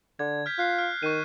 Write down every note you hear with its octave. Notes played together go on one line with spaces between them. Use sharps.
D3 G#6
F6 G6 B6
F4 F#6 C7
F6
D#3 C#6 D#7